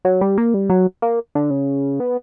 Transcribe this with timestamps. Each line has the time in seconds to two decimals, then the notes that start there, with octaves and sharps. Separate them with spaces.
0.05 F#3
0.21 G3
0.38 A#3
0.54 G3
0.70 F#3
1.02 A#3
1.35 D3
1.51 C#3
2.00 B3